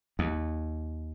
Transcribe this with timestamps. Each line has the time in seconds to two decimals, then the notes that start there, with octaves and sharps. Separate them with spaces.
0.19 D#2